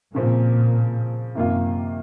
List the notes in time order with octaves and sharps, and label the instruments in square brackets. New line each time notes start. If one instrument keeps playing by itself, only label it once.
[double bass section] A#2 [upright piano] C#3 F3 C4
[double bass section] F#2 [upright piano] C3 D#3 A#3 F4